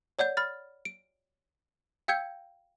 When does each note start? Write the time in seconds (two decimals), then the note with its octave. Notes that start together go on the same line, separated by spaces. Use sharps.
0.19 C#5 D5 F#5 G6
0.37 B5 F6 A6
0.85 D7
2.08 F5 G5 E6 G6 G#6 C#7